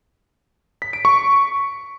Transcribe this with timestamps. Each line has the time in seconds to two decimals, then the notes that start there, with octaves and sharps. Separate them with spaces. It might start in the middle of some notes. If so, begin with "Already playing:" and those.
0.82 B6
0.93 D7
1.05 C#6